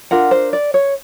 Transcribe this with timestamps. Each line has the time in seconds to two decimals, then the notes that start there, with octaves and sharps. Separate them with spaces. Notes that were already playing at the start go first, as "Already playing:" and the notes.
0.11 D4 F4 A#4 F#5
0.31 C5
0.53 D5
0.74 C#5